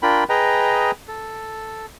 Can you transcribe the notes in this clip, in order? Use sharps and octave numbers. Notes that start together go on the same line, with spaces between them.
D4 F4 A#4 G5 B5
G#4 B4 D#5 G5 A#5
A4